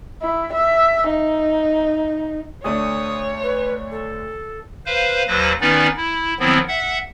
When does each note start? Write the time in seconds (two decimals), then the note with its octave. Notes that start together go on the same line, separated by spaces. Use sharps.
0.22 E4
0.53 E5
1.10 D#4
2.64 D2 A3 D4 C#5 D#6
3.43 B4
3.91 A4
4.86 B4 C5 F5
5.27 D#2 F#3 B4 C5 A#6
5.61 D#3 B3 C#4 D#4 B4 D5
5.97 E4
6.39 D#3 F3 F#3 B3 C4 E4
6.68 E5 F#5